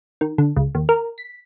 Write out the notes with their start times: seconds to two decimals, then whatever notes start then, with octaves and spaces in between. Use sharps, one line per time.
0.21 D#3
0.38 D3
0.56 C#2
0.75 D#2
0.89 A#4
1.18 B6